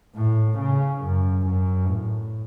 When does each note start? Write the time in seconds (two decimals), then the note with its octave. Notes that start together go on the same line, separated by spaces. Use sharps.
0.16 A2
0.59 C#3
1.02 F#2
1.46 F#2
1.88 A2